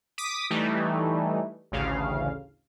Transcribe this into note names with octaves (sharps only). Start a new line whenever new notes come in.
D6 D#6 B6
E3 G3 A3 D#4
A1 D2 C#3 F5